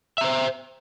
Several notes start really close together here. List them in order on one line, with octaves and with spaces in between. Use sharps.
E5 A#5 C5